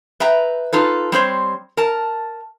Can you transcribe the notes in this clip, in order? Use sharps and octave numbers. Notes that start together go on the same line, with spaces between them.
B4 E5 G5 A#5
D#4 F4 A4 B4
G3 C4 C5 C#5
A#4 A5